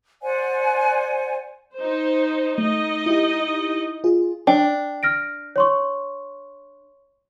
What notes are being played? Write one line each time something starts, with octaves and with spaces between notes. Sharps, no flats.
C5 D5 F#5 G#5
D#4 C5
A3 D#4 D#5
E4 G4
F4 G#4
D4 G5
F6 A#6 D7
C#5 C6 C#6